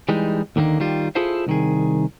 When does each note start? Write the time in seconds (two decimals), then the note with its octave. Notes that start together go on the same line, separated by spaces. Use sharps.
0.09 E3 G3 G#3 D#4
0.56 D#2 D3 D#3 A3 A#3
0.80 D#3 G3 F4
1.15 E4 F4 G#4 A4 C5 F5
1.47 C2 D#3 G#4